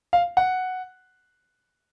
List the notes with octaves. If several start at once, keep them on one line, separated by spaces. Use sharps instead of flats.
F5
F#5